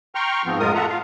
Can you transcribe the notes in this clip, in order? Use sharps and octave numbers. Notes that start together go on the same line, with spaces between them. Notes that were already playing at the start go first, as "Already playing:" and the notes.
G5 A#5 C6 C#6 F6
G#2 F3 B3 C4
F#2 A2 G#3 F4 A#4 D#6
F4 A4 E5 F#5 A#5
F4 F5